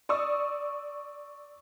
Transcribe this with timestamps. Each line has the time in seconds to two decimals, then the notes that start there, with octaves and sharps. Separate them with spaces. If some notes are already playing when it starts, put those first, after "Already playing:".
0.09 D5 C#6 D#6 E6